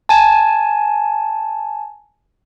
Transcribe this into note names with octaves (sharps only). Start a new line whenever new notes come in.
G#5 A5